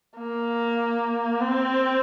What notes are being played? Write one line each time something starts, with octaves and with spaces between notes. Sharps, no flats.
A#3
C4